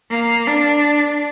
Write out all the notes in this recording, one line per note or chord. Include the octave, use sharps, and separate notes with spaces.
A#3
D4